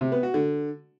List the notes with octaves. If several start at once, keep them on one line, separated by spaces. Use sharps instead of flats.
C3
B3
F#4
D3